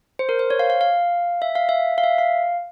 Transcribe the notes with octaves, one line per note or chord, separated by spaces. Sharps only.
C5
A#4
C5
C#5
F5
F5
F5
E5
F5
E5
F5
E5
F5